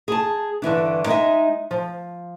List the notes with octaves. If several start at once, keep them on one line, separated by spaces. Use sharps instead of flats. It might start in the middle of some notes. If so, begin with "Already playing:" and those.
G#4 A5
G2 D3 E3 D4
G#3 D#4 C#5 D#5 E5
F3